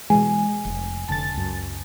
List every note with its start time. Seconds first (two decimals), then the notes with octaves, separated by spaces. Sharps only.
0.10 B2 E3 G#3 G#5
0.65 F1
1.09 F1 D3 A5 A6
1.33 C#2 F#2